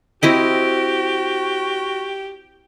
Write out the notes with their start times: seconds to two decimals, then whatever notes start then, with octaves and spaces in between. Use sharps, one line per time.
0.23 C4 E4 F#4 G4 D#5